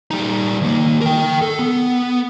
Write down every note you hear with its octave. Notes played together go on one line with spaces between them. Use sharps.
G3 D#4
D#2 A#3
A#4 G5
A4
B3